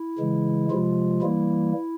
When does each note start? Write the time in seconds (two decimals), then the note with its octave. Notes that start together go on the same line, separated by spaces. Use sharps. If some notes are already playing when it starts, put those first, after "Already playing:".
Already playing: E4
0.19 C#3 E3 G#3
0.71 C3 F3 G#3 F4
1.21 E3 G3 A#3 E4